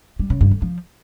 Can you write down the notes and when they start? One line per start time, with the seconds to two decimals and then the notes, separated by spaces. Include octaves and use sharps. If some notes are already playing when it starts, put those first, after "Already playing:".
0.19 G3
0.30 C#3
0.41 G2
0.51 D3
0.62 F3